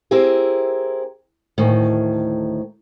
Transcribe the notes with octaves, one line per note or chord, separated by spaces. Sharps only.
C4 E4 G4 G#4 A#4
D2 A2 D#3